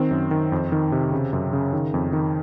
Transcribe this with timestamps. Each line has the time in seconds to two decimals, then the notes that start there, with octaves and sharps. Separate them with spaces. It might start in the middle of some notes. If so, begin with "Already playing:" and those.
Already playing: D#3 C4
0.11 F#2
0.31 D#3
0.52 F2
0.72 D#3
0.92 C3
1.12 C#3
1.33 F#2
1.53 C#3
1.73 D#3
1.94 F2
2.13 D#3